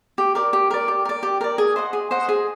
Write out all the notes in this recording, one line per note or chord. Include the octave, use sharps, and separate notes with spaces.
G4
A#4 D5
G4
A#4 D5
G4
A#4 D5
G4
A#4 D5
G#4
C5 D#5 F#5
G#4
C5 D#5 F#5
G#4